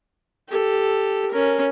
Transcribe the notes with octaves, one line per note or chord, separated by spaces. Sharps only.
G4 A4
C#4 A#4